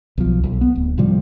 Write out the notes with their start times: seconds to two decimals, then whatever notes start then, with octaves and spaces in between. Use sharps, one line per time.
0.18 B1 F3
0.44 B1
0.61 B3
0.75 D1
0.98 A2 C3 F3 G3